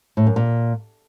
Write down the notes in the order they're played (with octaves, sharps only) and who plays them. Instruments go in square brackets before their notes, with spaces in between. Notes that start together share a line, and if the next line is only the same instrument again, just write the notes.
[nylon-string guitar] A2
F#2
A#2